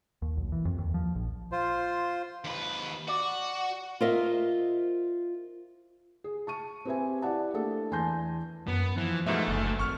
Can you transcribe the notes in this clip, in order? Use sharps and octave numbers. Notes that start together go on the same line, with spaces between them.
D#2
B1
E3
F2
D#2
F3
A#1
F4 C5
D#2 B4
F#4 D5
F4 A#4 C5 D#5 E5
G#4
A5 C#6 D#7
C4 G4 B4 C5 E5 G#5
E4 G4 D5 F#5 A5
A3 A#3 D4 A4
E2 G#5 A5 C6 G6 A#6
F#2 B3
E3 F3
G#2 B2 A3 E5
F#1 D2
G#1 C#6 F6